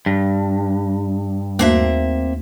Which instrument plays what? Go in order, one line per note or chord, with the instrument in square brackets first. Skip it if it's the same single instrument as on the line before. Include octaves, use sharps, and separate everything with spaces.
[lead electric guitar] G2
[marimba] D#2 A3 F#4 [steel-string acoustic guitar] A#3 C4 E5